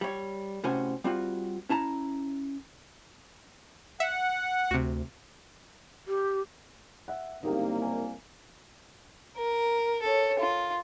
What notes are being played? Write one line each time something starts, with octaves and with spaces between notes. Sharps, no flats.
G3 C#5
A2 C3 C#4 F#4 C5 G#5
G3 C4 F4 F#4
C#4 E4 A5 A#5
E5 F#5
D2 C3 F#4
G4
E5 F#5
F#1 C2 A#3 D#4 G4 F5
G#5
A#4
A4 C#5
F4